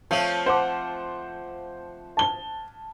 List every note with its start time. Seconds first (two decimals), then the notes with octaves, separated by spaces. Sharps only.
0.11 F3 A3 C4 C#5 F5
0.46 C5 F#5 D6
2.17 A5 G7